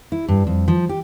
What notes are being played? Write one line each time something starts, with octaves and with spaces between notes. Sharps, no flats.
E4
G2
F2
F3
G4